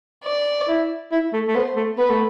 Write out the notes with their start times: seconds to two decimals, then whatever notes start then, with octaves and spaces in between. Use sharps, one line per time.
0.24 D5
0.68 E4
1.12 E4
1.33 A3
1.48 A3
1.55 B3 C5
1.76 A3
1.98 B3 B4
2.10 A3